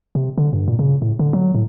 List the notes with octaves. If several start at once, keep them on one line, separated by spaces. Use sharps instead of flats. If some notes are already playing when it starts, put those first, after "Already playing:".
C3
D3
G2
A#2
C#3
A2
D3
F#3
A2